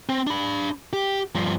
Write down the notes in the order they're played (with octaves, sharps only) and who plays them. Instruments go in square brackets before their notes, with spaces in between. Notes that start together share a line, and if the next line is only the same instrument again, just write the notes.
[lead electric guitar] C4
D4 B5
G4
G2 F3